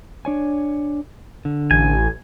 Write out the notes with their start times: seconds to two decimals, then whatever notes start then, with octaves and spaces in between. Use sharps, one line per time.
0.25 D4 C#5 G#5
1.45 D3
1.71 A1 G#5